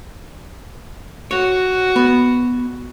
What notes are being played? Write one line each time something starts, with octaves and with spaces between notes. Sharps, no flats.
F#4 C#5
B3